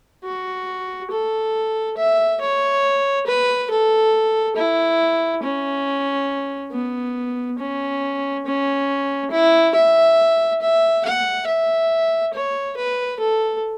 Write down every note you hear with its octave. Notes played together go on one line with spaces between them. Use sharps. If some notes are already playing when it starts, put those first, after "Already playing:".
F#4
A4
E5
C#5
B4
A4
E4
C#4
B3
C#4
C#4
E4
E5
E5
F#5
E5
C#5
B4
A4